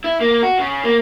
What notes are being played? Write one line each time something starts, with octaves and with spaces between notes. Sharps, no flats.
E4
A#3
F#4
C#3
A#3